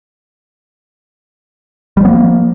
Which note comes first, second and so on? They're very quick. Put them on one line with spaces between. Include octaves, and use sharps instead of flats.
G3 F3 B3 A#3